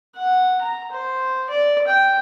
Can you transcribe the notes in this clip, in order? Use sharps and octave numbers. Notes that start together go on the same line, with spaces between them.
F#5
A#5
C5
D5
G5